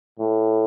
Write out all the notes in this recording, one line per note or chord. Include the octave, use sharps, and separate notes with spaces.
A2